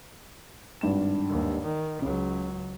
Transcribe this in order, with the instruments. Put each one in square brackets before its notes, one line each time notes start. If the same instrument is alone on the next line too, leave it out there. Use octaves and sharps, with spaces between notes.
[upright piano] G#1 G2 E7
[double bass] D#2
D#3
[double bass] C#2 F#3 [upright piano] C#3